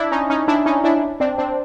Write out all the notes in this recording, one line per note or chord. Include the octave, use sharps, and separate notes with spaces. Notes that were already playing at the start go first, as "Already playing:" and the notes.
Already playing: D4 E4
C#4 D#4
C#4 D#4
D4 E4
C#4 D#4
D4 E4
C4 D4
C4 D4